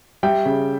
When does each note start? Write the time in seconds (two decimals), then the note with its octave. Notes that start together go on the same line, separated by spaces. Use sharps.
0.23 G3 E5 G5
0.46 C#3